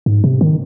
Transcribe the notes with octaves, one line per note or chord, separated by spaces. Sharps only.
G#2
C3
D#3